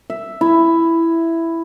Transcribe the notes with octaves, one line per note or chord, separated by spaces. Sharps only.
E5
E4